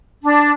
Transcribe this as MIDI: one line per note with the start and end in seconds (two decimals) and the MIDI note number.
0.22 0.51 62